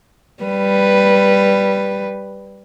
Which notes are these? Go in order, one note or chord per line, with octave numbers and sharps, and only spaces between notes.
G3 B4